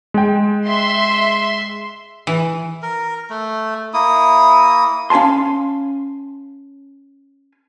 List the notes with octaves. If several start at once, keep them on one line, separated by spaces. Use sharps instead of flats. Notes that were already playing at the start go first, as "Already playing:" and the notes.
G#3 G5
E5 C6
E3
A#4
A3
A#3 E4 D#6
C#4 F5 G#5 A5 C6